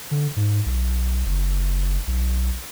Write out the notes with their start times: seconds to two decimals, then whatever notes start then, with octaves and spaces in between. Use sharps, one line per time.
0.11 D3
0.36 G#2
0.66 B1
1.26 F#1
2.07 B1